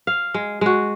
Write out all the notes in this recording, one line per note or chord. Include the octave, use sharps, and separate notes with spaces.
F5
G#3
G#3 F#4